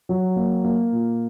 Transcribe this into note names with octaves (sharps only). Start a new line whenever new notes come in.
F#3
A#3
A#3
A#2